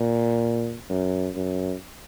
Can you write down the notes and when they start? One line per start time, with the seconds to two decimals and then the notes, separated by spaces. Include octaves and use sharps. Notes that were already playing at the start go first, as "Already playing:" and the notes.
Already playing: A#2
0.90 F#2
1.35 F#2